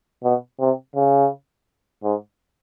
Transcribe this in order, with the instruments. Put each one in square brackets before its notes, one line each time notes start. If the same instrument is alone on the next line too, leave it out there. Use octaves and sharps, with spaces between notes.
[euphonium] B2
C3
C#3
G#2